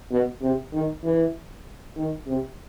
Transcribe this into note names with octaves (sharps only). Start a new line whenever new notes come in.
B2
C3
D#3
E3
D#3
C3